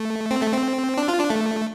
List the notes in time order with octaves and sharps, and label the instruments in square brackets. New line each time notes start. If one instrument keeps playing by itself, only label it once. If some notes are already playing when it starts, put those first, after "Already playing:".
Already playing: [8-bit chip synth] A3
C4
A3
C4
D4
F4
D4
A3